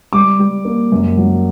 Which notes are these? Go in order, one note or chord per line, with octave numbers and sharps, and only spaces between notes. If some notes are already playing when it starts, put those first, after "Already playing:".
G3 D6
G3
A#3
F#2
F#3